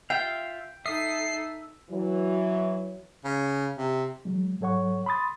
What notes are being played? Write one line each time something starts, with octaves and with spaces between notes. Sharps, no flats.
F4 E5 F5 G5
D#4 A4 E5 D#6 C7
E3 F#3
C#3
C3
E3 F#3 G#3
G#2 F#3 A4 C#5 F#5 C#6
B5 C6 D#6 A6